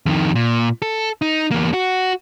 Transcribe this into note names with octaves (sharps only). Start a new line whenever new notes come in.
F2 D#3
A#2
A4
D#4
E2 A#3
F#4